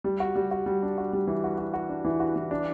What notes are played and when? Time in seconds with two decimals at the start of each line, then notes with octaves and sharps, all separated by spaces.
0.04 G3
0.20 F#4
0.35 G3
0.51 F#4
0.66 G3
0.82 D4
0.98 F#4
1.13 G3
1.27 E3
1.44 F#4
1.58 F#4
1.74 F#4
1.89 D4
2.05 E3
2.20 F#4
2.36 E3
2.51 D4